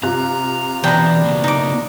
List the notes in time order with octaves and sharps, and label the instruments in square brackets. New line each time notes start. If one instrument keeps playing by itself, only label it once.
[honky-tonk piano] C3 F4 F#6 [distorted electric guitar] A#5
[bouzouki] B2 D4 [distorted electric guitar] E3 B5 [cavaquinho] G5 A#5
[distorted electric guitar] C#3 A#3
[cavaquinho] D#4 D6